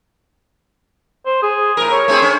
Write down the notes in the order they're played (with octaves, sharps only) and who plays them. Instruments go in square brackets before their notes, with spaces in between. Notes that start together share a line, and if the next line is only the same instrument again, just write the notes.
[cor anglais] C5
G#4
[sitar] A2 A#4
[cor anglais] C#5
[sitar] A3 C4 G#4
C#4